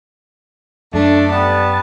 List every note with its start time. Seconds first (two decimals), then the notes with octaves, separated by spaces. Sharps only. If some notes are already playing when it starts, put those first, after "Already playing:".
0.94 F#2 A3 D4
1.31 G3 B3 A5